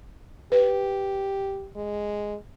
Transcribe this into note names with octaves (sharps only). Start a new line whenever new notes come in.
G4 B4
G#3